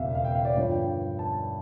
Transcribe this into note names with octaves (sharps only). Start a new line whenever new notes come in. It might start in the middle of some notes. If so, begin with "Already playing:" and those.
Already playing: E1 E2 C#3 E5 F5
F5
G5
F5
D5
G2 D3 F3 C#5
G5
A5